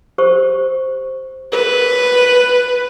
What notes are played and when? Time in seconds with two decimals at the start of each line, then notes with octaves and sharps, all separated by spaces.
0.18 G4 C5 C#6
1.52 G#4 A#4 B4